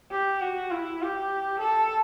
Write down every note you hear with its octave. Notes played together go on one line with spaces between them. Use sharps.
G4
F#4
E4
G4
A4